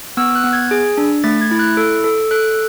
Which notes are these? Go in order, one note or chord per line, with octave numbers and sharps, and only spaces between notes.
B3 E6
F#6
B3
G#6
G#4
D4
A3 A6
G#6
E4
F#6
A4
A4
A4 F#6